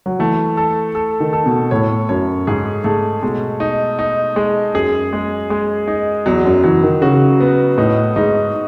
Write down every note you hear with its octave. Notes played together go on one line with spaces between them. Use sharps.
F#3
E3 A3
A4
A4
D#3
A4
B2
A2 C#5
F#2 C#5
G#2 G#4
G#2 A3
B2 G#3
D#4
D#4
G#3
F#2 G#4
G#3
G#3
D#4
E2 F#3
F#2
E3 F#3
D#3
C#3 F#4
B3
A2 D#4
G#2 D#4